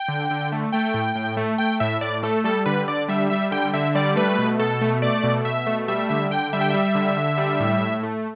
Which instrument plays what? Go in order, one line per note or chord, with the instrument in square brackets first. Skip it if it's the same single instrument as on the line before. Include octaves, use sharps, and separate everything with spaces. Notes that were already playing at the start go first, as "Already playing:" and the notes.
Already playing: [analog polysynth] G5
D3
D3
A3
A3 G5
A2
A2
A3
A3 G5
A2 E5
A2 D5
A3 A4
G3 A4
D3 B4
D3 D5
G3 E5
G3 E5
D3 G5
D3 E5
G3 D5
A3 B4
B2
B2 A4
A3
A3 D5
B2
B2 E5
A3
G3 E5
D3 E5
D3 G5
G3 E5
G5
G3 E5
D3
D3
G3
A2
A2
A3